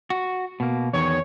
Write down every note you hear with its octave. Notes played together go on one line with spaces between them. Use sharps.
F#4
B2 A#3
E2 D#3 C#5